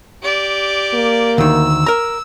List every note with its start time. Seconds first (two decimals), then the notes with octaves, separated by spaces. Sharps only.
0.22 G4 D5
0.94 A#3
1.38 D2 D#3 E6
1.86 A#4 A#5